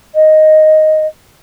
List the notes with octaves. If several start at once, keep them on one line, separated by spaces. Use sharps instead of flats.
D#5